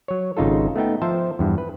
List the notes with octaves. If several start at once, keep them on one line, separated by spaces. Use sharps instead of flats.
F#3 C#5
G#1 C#3 D#4 F4 A4
A3 B3 D#4 G5
F3 C5 E5 A5
E2 G2
B4